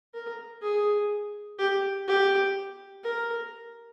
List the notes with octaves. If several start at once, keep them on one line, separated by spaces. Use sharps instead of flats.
A#4
G#4
G4
G4
A#4